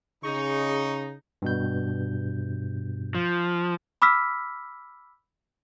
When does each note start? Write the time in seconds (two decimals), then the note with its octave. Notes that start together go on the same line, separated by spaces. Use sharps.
0.24 C#3 D#4 G#4 C#6
1.42 G2 B2 G6
3.15 F3
4.02 B5 D6 E6 F6 B6